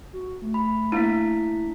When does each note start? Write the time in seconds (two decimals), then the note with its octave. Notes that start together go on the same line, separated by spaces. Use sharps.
0.13 F#4
0.42 A3
0.54 B5
0.92 A3 A#3 D4 E4 B6